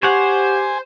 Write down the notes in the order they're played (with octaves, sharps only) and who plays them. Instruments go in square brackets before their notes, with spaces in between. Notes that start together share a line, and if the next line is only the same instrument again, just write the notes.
[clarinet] G4 [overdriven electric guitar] C5 [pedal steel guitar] C#5 F#5 [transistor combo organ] G#5